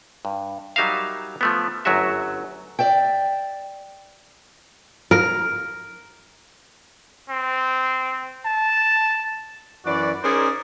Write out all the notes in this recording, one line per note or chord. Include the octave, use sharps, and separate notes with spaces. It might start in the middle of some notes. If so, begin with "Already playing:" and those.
G2
F#3 G3 D#4 A#4 E5 F5
F3 A3 B3
G1 F#2 F#3 A3 F#4 E5
D5 E5 G5
A#4
C4
A5
F#2 E3 F#4 D5
C#4 D#4 G#4 A#4 C5 D5